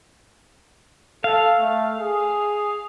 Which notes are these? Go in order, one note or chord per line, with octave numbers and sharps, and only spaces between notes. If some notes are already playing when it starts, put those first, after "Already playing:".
A4 F5
A3
G#4